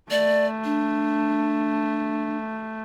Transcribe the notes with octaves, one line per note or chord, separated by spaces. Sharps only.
A3 D5
D4